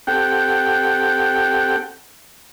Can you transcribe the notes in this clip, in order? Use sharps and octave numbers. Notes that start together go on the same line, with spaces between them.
C4 G4 A4 F#5 G5